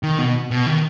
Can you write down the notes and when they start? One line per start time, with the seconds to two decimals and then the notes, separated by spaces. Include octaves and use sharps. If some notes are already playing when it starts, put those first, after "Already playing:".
0.03 D#3
0.18 B2
0.51 B2
0.66 D#3